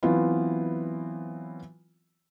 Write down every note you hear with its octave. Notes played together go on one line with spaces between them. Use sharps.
E3 F#3 B3 C4 E4 F4